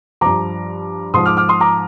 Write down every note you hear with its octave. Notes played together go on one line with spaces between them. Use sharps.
G2 F3 A#5 D6
G#2 F3 C6 D#6
D6 F6
D6 F6
C6 D#6
A#5 D6